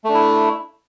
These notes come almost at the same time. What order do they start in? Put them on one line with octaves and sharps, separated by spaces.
A3 D4 E4